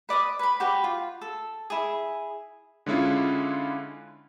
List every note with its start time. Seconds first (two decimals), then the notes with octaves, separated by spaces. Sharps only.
0.09 B4 D5 D6 D#6
0.39 B4 B5
0.60 F#4 G4 B4
0.84 F4
1.21 A4
1.70 E4 G#4
2.86 D3 G#3 C#4 E4 F4